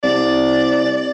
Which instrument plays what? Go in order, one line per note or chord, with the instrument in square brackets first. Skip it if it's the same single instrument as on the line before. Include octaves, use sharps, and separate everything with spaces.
[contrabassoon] C2 [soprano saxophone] D5